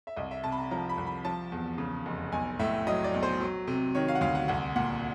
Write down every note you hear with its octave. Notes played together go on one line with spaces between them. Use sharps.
E5
C2 D#5
E5
C3 A5
B5
A#5
F3 A#5
B5
C2
B5
F3 A5
E2
C#3
F1
B1 G#5
A2 E5
F#3 D#5
D5
B1
C5
F#3
C3
D#3 C#5
F5
F#5
D2 F5
F#5
C2 F#5
A#2 F#5